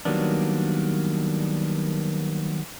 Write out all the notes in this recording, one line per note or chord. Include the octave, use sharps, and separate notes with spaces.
D#3 F#3 G3 A#3 B3 D4